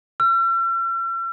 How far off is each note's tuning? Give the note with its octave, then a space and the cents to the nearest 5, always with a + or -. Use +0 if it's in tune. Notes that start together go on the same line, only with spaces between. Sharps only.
E6 +45